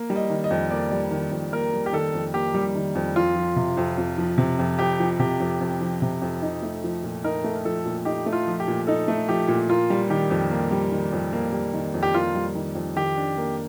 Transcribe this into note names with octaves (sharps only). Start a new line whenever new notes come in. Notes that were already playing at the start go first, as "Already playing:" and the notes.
Already playing: A#3
G3
D#5
D#3
D#5
F2
A#3 D5
G3
D#3
F2
A#3 A#4
G3
G4
D#3 A4
F2
A#3 G4
G3
D#3
F2
F2 F4
F3
C3
F2
F2
F3
C3
F2
F2 G4
F3
C3 G4
F2
F2
F3
C3
F2
D#4
A3
F3
A#2
D#4 A#4
A3
F3 A4
A#2
D#4 G4
A3
F4
F3
G4
A#2
D#4 A4
A3
F3 G4
A#2
A#3 F4
G3
D#3 G4
F2
A#3
G3
D#3
F2
A#3
G3
D#3
F2
G4
A#3 F4
G3
D#3
F2
D#3 G4
D4
A#3